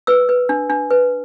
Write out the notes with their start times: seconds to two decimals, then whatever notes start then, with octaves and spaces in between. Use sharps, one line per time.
0.07 B4 E6
0.29 B4
0.49 D4
0.70 D4
0.90 B4